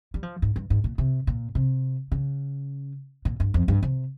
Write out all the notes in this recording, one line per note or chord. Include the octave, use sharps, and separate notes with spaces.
G3
F3
G#2
G2
G#2
A#2
C3
A#2
C3
C#3
A#2
G2
F2
G2
C3